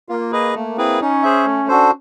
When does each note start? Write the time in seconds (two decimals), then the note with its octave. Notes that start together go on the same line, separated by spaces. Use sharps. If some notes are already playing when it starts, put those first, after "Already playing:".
0.09 A#3 F4
0.32 G#4 B4 D#5
0.54 A3 A#3
0.78 C4 E4 G#4 B4
1.00 C#4 D#4
1.23 G#4 C5 E5
1.45 A3
1.68 D4 F#4 A4 C5